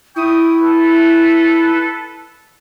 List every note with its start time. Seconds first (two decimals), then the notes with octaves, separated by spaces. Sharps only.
0.16 E4 G5 C#6 D#6
0.61 A4 B4